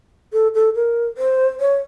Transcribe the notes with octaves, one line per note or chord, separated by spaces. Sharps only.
A4
A4
A#4
C5
C#5